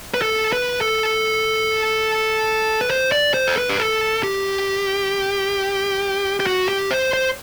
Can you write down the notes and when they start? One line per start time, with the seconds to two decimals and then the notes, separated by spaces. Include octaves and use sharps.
0.14 B4
0.22 A4
0.53 B4
0.81 A4
2.81 B4
2.90 C5
3.12 D5
3.34 C5
3.47 A4
3.57 B4
3.69 G4
3.79 A4
4.23 G4
6.40 G4
6.47 F#4
6.69 G4
6.91 C5
7.13 C5